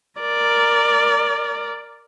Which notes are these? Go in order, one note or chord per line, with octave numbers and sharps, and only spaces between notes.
A#4 D5